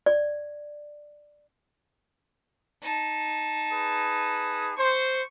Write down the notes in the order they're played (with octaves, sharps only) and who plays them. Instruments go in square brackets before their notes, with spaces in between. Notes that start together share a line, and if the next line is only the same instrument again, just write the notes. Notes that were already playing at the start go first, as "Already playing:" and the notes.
[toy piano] D5
[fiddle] D#4 A5
[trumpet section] G#4 B4
[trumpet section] C5 [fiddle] C#6